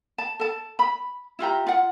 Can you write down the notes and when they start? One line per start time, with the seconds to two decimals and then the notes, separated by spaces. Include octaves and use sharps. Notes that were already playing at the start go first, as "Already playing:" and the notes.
0.18 A5
0.39 A4 A5
0.79 B5
1.39 E4 F4 G4 A#5
1.66 F4 F#5